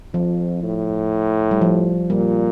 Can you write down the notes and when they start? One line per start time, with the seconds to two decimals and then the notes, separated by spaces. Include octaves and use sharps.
0.14 F2 F3
0.63 A2
1.51 G3
1.61 F3
2.10 A#2 G3